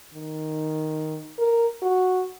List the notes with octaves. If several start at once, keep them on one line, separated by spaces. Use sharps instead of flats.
D#3
A#4
F#4